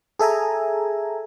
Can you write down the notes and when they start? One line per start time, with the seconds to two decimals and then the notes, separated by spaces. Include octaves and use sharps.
0.19 G#4 A4 E5 G#5 A#5